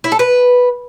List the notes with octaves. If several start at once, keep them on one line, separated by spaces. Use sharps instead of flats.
E4
A4
B4